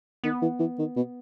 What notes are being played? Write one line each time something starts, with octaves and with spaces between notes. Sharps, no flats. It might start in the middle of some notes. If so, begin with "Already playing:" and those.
D#3 B3
E3
E3
D#3
B2